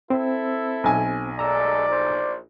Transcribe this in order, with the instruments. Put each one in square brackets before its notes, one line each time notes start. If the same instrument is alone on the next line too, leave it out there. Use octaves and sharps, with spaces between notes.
[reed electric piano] C4 C5 [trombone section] E4 A4
[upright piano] B1 G#5
[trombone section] D#2 G#3 A3 [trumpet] D5 [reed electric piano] A#5 E6
[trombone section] A#1 C5